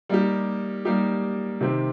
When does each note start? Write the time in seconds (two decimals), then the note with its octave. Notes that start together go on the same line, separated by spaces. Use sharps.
0.09 G3 A#3 D#4 G4
0.85 G3 A#3 D#4 G4
1.61 C3 D#3 C4 G4